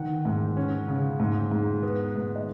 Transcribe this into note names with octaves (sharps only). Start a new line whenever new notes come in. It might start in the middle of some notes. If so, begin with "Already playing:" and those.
Already playing: D#3 F#5
G#2
C#4
C#3
G#2
G#2
B3
G#2
D#5